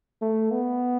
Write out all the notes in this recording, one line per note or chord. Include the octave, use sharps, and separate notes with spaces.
A3
B3